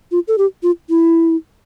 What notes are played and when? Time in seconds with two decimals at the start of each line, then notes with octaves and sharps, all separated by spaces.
0.11 F4
0.28 A4
0.38 G4
0.63 F4
0.90 E4